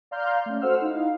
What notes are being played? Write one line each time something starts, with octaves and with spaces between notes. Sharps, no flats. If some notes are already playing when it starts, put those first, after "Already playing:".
D5 F5 A#5 C6 F6 G6
A3 C#4
F#4 A4 C5 F#5 E6 F6
D#4 E4 F5